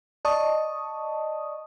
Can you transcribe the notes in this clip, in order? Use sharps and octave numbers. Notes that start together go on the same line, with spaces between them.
D5 D#5 A5 C#6 D#6